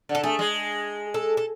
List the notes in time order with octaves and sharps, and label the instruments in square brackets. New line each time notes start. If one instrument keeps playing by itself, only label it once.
[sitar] D3
[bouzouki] A4
[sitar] A3 [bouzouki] G#4
[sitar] G#3
[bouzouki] A4
A4